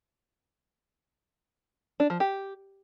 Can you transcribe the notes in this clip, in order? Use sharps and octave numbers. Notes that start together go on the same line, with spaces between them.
D4
F3
G4